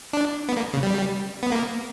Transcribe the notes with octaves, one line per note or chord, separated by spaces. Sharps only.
D4
B3
A#3
C#3
G3
B3
A#3